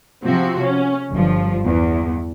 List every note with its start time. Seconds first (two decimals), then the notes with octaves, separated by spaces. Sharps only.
0.24 C3 F3 C4 F#4
0.62 C#4
1.11 G1 G2 F3
1.66 E2